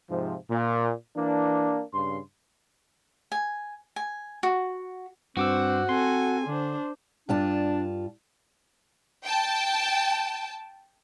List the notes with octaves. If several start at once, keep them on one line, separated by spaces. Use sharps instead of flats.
G#2 C3 F3
A#2
E3 A#3 D4
G2 C#3 C6
G#5
G#5
F#4
G2 C4 F#4 C5 D6 E6
C4 A4 G#5 C6
D3 D4 C5
G2 D4 F4 A5
G5 A5